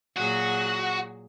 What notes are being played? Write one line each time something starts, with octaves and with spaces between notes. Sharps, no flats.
A#2 F#3 F#4 G#4